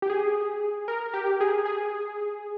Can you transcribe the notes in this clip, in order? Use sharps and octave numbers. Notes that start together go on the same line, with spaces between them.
G4
G#4
A#4
G4
G#4
G#4